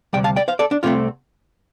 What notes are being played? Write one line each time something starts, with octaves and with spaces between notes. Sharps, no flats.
D2 C3 G3 D5 G5
F5 A5
D5 G5
C5 F5
A4 D5
D4
C2 C3 A3 C4 F4